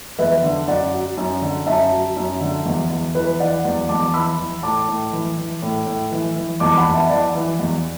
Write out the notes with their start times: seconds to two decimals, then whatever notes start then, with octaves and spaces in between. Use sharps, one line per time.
0.19 E2 B4 E5
0.43 D3
0.68 F#2 D5 F#5
0.92 F#3
1.17 F#2
1.42 D3
1.66 F#2 E5 A5
1.92 F#3
2.17 F#2
2.41 D3
2.65 E2
2.90 E2
3.15 E3 B4
3.40 E3 D5 F#5
3.64 E2 D5 F#5
3.89 E2 A5 D6
4.14 E3 B5 E6
4.38 E3
4.63 A2 A5 D6
4.88 A2
5.13 E3
5.38 E3
5.62 A2
5.86 A2
6.12 E3
6.36 E3
6.60 E2 A5 D6
6.77 F#5 B5
6.86 E2
6.94 E5 A5
7.10 E3 D5 F#5
7.35 E3
7.59 E2